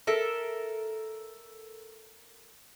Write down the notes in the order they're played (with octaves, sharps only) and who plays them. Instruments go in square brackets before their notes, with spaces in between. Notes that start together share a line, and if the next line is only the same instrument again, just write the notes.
[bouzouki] A4 A#4 E5